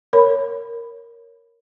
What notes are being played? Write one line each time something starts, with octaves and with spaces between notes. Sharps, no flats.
A#4 C#5 B5